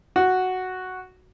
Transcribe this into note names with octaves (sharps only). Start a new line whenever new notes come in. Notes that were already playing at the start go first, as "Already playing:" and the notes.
F#4